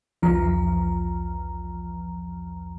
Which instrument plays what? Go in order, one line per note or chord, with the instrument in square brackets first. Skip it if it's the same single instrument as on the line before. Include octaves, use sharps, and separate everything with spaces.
[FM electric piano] B1 E2 F3 A#5